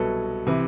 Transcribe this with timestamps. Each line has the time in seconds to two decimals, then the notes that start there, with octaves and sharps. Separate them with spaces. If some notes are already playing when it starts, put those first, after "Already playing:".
Already playing: C2 B2 F#3 A4 B4
0.47 C3 E3